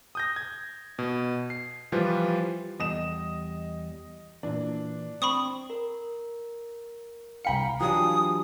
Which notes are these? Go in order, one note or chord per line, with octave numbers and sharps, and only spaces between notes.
D#6 G6 A#6
G#6
B2
C7
E3 F3 G3 F4 B4
E2 G3 D#5 D#6 E7
A#2 E3 D4
C4 B5 C#6 D#6
A#4
C2 F5 G5 A#5 B5 C#7
E3 F#3 D4 F4 G4 G#5 D#6